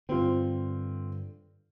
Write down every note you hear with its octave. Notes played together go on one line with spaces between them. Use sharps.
G2 D3 C4 F4